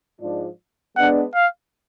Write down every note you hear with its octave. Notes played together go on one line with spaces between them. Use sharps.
G#2 F3 G#3 D4
G#3 B3 D4 F#5
F5